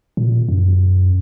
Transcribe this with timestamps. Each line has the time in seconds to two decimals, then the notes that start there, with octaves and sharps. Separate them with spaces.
0.17 A#2
0.49 F#2